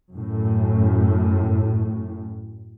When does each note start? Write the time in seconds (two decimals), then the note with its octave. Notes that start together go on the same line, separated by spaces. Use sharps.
0.13 F#2 A2